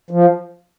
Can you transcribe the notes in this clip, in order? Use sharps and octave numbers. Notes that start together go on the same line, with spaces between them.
F3